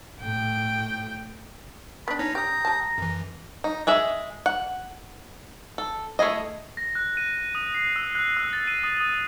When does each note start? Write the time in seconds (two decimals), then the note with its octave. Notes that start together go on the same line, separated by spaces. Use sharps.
0.21 A2 G5
2.08 B3 D4 B5
2.19 C#4 D#4 C#5 A#5
2.35 G4 A#5 D#6 G6
2.65 G3 A5
2.98 F#2 E3
3.64 D#4
3.87 G#3 G#4 E5
4.46 F#5
5.78 A4
6.19 A3 E4 G#4 D#5
6.77 A#6
6.95 F#6
7.17 D#7
7.55 D#6
7.74 C7
7.96 E6
8.15 F#6
8.37 E6
8.53 A6
8.67 D#7
8.84 D#6
9.00 D#6